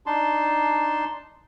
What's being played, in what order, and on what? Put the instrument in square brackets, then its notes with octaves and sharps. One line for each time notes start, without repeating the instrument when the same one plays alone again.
[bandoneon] D4 D#4 A5 C6